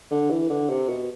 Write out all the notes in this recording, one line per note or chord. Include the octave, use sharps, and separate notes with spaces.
D3
E3
D3
C3
B2